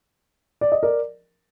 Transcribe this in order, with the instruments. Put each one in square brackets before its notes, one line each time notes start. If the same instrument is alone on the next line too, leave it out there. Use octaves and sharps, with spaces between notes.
[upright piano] D5
D#5
A#4 D5